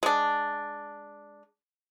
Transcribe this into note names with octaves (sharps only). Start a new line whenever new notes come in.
G#3 D4